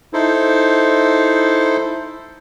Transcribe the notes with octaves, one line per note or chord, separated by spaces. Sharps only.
D#4 E4 A4 C5